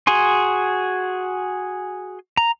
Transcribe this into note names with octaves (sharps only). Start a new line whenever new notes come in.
F#4 G#4 G#5 C6
A#5